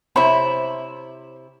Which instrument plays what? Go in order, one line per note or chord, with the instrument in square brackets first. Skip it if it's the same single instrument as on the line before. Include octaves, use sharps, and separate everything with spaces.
[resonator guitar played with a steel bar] C3 E4 [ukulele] C5 C#5 B5